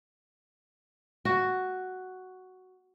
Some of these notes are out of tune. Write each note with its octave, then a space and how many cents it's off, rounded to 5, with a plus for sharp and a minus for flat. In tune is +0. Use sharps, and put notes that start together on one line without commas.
F#4 +5